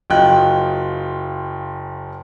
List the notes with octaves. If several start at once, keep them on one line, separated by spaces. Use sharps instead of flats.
F#1 F#3 F4 D#5 G5 F#6